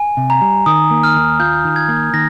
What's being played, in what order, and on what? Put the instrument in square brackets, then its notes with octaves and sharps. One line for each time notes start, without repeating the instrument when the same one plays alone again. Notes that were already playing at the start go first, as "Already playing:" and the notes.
Already playing: [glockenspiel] G#5
[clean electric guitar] C3
[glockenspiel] A#5
[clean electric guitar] G3
[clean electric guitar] D#3 [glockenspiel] D#6
[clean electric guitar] A#3
[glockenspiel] F6
[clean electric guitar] D#2
[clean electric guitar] F4 [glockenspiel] G6
[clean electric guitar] D#3
[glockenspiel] G#6
[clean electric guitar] A#3
[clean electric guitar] D#3 [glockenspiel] A#6